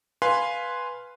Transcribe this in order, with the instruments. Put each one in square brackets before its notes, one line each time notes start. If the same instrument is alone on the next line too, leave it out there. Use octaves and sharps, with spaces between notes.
[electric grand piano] B4 F5 G#5 C6